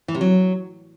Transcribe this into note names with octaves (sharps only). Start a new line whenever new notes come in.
E3
C3
F#3